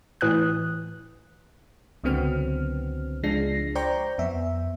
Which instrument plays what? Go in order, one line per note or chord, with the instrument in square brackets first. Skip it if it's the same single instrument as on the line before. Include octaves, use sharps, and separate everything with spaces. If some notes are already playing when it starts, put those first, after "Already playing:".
[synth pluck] A2 E3 D#6 F#6
[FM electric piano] C#2 D3 F#3 B3 C4 F6
C#2 F3 G#3 D4 A#6 C7
C5 D5 G5 A#5 C#6 G6
F2 B3 E5